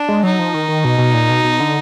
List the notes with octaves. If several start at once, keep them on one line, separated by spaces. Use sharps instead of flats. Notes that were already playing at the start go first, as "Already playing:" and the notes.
Already playing: D4
G#3
F#3 D#4
F3
D#3
D#3
B2
B2
A#2
B2
B2
D3